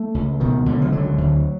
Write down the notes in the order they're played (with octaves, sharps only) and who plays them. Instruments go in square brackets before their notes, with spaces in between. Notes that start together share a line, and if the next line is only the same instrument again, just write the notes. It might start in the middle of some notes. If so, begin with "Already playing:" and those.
Already playing: [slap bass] A3
C#2
B2 D#3
C#2 D3
F3
D3 F#3
D2